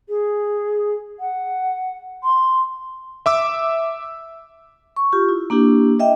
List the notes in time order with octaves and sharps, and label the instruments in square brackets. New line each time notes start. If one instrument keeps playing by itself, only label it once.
[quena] G#4
F#5
C6
[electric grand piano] E5 D6 E6
[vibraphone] C#6
F4 G4
E4
A#3 D4 E4 G4
D#5 E5 G5